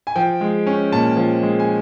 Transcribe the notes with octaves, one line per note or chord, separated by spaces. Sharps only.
G#5
F3 G5
G#3
C#4
A#2 A5
F3
G#3
G#5